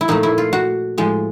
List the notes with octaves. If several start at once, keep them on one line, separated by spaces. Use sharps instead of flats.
E4
A#2 F3 A3 D#4
E4
F4
F#4
A2 F3 G#3